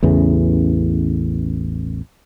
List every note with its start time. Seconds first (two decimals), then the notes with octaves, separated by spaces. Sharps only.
0.03 A1 E2 C#3 E3